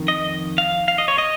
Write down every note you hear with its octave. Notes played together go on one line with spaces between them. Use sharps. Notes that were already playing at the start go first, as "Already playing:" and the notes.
Already playing: F2 D#3
D#5
F5
F5
D#5
C#5
D#5